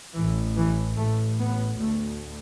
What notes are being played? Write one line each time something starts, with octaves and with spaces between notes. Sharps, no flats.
A1 A2 E3
E3
A1 A2 A3
B3
D2 A3